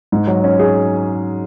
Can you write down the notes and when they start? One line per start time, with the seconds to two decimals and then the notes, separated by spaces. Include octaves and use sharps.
0.12 G#2
0.27 F#3
0.44 C#4
0.60 G#4